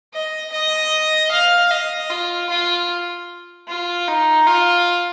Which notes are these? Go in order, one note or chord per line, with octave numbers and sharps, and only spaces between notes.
D#5
D#5
F5
D#5
F4
F4
F4
D#4
F4